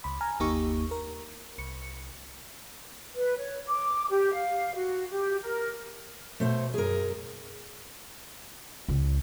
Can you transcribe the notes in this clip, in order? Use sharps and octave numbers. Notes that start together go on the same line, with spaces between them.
C#2 B5
G#5 A#5 F6
G1 D#2 A#3 D#4 G4 C#6
A#4
C2 C#7
B4
C#5
D6
G4
F5
F#4
G4
A#4
B2 A3 C5 C#5
F#2 G#4 A#4
C#2